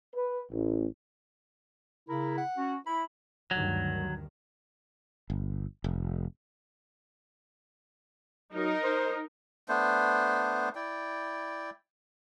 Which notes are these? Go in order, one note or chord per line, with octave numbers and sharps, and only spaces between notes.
B4
A1
C#3 E4 A#4
F#5
C#4 F#4
E4 B5
D2 G2 D#3 F#3
G1
F1
F#3 D#4 A#4
C5
A3 B3 D4 C5
E4 D5 G5